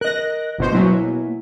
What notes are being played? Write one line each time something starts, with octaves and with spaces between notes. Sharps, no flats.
A#4 D#5 F#6 A#6
G1 B2 C5
B2 F#3 A#3 E4 G#5